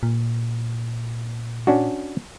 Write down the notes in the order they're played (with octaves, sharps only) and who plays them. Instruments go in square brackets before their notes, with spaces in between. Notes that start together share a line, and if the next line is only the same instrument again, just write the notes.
[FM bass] A#2
[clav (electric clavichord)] C#4 D4 F#4